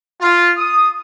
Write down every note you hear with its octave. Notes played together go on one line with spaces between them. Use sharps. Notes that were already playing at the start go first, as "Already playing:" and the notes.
F4
D#6